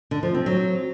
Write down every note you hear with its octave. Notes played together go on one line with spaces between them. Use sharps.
D3
F3
C4
F#3